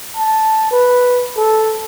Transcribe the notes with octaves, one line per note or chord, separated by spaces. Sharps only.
A5
B4
A4